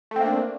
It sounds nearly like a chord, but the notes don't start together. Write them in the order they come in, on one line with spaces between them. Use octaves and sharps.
A3 C4 A#3 D4